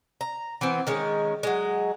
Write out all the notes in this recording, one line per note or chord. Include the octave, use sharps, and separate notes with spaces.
A#5
E3 B3 C4
D#3 G#3 C#4
F#3 G#3